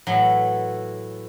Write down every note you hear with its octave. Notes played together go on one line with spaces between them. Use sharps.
A2 E3 F#3